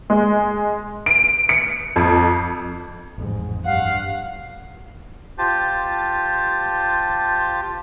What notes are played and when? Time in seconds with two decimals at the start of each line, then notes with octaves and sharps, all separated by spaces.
0.10 G#3
1.06 D7
1.49 C#7
1.96 F2
3.18 A1 F2 G#2
3.65 G2 F5 F#5
5.38 F4 G4 C5 A5